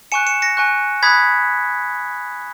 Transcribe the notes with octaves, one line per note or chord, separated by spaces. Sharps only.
G#5 C#6 F#6 C#7 E7
C#7 E7
A#6 C#7
G#5 C#6 F#6
B5 D#6 F#6 G#6 B6